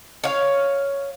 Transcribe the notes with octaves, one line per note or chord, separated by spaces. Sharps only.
C#5 F5